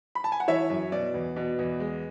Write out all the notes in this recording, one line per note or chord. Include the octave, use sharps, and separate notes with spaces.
B5
A5
G#5
F#5
E3 C#5 E5
F#2
B2 D5
E2
B2
E2
G#3